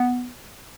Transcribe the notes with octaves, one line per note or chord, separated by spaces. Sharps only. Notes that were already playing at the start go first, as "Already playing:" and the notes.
Already playing: B3